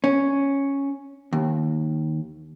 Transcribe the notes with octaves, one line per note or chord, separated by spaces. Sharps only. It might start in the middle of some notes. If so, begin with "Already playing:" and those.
C#4
D#2